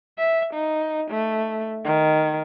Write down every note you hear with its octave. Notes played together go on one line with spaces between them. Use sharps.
E5
D#4
A3
D#3